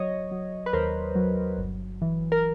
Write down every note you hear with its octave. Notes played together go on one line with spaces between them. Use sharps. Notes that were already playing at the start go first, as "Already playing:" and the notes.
Already playing: F#3 C#5 D#5
F#3
B4
D#2 A#4 C5
F#3
G1
E3
A#4